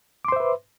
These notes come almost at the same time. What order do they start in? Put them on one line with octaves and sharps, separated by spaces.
D6 C6 C5 E5 B4